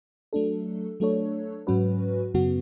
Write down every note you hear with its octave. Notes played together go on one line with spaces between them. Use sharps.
F#3 A3 D4 A4
F#3 A3 D4 A4 C#5
G#2 F#3 C#4 F#4 B4
F#2 C#3 F#3 B3 F#4